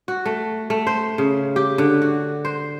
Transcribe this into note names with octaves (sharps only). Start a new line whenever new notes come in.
F#4
A3
A3
C5
C#3
G4
D3
F#4
C5